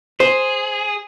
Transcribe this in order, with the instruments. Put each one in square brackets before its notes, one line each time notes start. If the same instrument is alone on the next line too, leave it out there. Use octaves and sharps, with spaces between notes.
[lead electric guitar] G#4 [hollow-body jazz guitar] C5